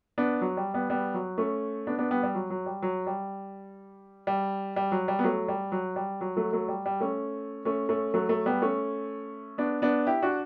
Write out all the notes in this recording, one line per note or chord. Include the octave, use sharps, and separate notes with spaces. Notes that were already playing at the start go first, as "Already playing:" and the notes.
B3 D4
F#3
G3
G3 B3
G3 B3
F#3
A3 C#4
B3 D4
B3 D4
G3 B3
G3
F#3
F#3
G3
F#3
G3
G3
G3
F#3
G3
B3
F#3 A3
G3
F#3
G3
F#3
F#3 A3
F#3 A3
G3
G3
A3 C#4
A3 C#4
A3 C#4
F#3 A3
F#3 A3
G3 B3
A3 C#4
B3 D4
B3 D4
E4 G4
D4 F#4